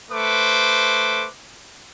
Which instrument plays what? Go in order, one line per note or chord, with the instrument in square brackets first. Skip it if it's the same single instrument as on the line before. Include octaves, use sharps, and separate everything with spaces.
[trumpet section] A3 B4 C5 D6